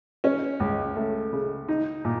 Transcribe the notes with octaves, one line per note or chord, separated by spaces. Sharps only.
C#4
C#2
A3
C#3
D#4
A#2